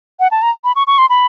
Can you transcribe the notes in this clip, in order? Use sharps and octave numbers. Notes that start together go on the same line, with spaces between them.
F#5
A5
A#5
B5
C#6
C#6
C6
B5